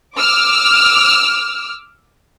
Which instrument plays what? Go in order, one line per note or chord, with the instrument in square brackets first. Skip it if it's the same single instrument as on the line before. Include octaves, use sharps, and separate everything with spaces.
[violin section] D6 E6 F6